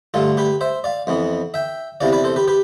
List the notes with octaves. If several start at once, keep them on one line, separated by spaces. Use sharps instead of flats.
G2 D3 A3 F4 A4
G4 B4
C5 E5
D5 F5
F2 E3 B3
E5 G5
E2 C3 E3 D5 F5
B4 D5
A4 C5
G4 B4
G4 B4